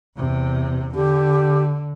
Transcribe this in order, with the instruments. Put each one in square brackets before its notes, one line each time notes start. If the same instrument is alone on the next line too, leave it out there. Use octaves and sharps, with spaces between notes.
[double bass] E2 C3
[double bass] D3 [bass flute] G4